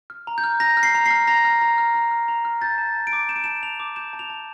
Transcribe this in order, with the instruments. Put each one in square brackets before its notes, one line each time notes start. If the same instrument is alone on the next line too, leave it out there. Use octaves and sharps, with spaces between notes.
[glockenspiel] F6
A#5
G6
F6
A#5 A#6
F6
C7
A#5
F6 C7
A#5 A#6
F6
A#5
F6
A#5
F6
A#5
F6
G6 A6
A5
A5
D7
D6
G6 E7
D7
A5 E7
A5 F7
D6
G6 E7
A5
F7
A5